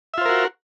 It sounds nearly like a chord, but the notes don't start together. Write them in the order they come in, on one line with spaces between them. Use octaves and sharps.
E5 F4 C5 A#4 F#4